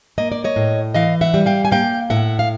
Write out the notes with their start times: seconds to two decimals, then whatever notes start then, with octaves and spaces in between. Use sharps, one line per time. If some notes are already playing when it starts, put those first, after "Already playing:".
0.18 A#3 D#5
0.32 D5
0.44 C#5 D#5
0.56 A2
0.94 E3 D#5 F5
1.21 E5 F#5
1.34 G3
1.46 F5 G5
1.65 G#5
1.71 A#3 F5 G5
2.10 A2 E5 F#5
2.39 F5